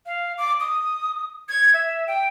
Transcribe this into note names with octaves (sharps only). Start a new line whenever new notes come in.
F5
D6
D#6
G#6
E5
G5